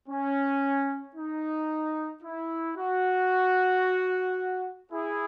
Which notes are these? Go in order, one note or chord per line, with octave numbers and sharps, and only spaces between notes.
C#4
D#4
E4
F#4
E4 G#4